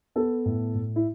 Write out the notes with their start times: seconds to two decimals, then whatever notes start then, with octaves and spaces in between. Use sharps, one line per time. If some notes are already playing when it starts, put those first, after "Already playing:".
0.15 B3 A4
0.46 A2
0.75 A2
0.96 E4